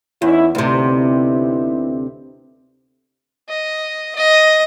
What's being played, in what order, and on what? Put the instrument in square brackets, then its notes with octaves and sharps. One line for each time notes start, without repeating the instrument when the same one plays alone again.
[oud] E2 [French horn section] C#4 D#4 E4
[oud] D2 C3 [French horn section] B3 D#4 E4
[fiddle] D#5
D#5